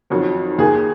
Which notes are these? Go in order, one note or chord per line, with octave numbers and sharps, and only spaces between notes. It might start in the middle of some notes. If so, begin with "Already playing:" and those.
F2 D#3 F#3
D#2 D#3 A#3 G#4